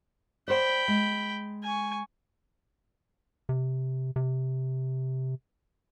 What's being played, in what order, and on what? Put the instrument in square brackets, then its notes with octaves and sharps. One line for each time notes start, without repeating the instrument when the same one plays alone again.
[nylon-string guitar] C5 D5 [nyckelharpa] G5 B5
[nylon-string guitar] G#3
[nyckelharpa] G#5 C#6
[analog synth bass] C3
C3